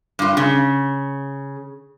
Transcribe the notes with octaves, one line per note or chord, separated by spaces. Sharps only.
G2 F4
C#3